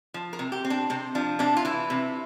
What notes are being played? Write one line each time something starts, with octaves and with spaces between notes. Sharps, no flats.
F3
A#4
C3
G4
C4
D4
C3 C4
F3 D4
C3 D4
F4
E3 E4
C3